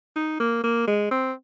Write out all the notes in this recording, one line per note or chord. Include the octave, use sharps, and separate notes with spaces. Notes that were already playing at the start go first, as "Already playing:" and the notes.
D#4
A#3
A#3
G#3
C4